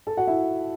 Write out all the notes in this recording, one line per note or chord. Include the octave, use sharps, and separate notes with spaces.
A4 A5
F#4 F#5
E4 E5